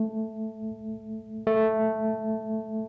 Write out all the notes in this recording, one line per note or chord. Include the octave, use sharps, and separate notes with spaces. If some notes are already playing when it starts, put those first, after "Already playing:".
Already playing: A3
A3